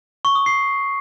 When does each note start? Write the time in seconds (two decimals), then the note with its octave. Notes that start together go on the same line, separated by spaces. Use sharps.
0.25 C#6
0.35 D#6
0.46 C7